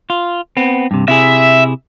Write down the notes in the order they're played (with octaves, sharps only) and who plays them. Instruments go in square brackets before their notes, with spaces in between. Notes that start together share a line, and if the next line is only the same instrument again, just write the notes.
[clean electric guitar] F4
B3 C4
G2 C3
[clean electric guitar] C3 E4 G#4 [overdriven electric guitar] E5